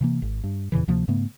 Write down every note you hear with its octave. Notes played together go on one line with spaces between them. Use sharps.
C3 E3 A#3
G#1
G2
E2 A#2 C#3 E3
D2 C3 F3 A#3
G#2 C#3 A3 B3